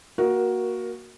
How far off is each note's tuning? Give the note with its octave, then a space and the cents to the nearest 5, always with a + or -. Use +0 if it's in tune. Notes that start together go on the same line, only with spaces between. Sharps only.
A#3 +0 F#4 +0 A#4 +15